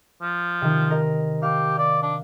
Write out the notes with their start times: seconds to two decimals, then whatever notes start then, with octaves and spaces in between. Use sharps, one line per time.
0.22 F3
0.61 C3 D#3
0.90 A#4 D#5
1.42 G4 F5
1.78 D5
2.03 D4